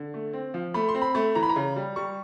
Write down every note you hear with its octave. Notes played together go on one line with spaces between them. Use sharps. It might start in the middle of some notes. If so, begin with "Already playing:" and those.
Already playing: D3
A3
C4
F3
A3 B5
C6
C4
B5
A3
E3 A#5
B5
A#5
C#3
G3
G3 C#6